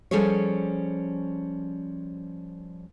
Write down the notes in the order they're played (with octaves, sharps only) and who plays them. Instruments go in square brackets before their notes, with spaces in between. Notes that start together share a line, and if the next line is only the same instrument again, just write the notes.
[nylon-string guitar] F3 G3 C#4 G#4 A4 C#5